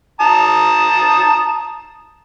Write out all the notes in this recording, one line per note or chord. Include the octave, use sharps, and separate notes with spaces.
A5 A#5 D#6